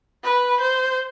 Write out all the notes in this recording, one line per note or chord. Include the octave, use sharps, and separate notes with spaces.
B4
C5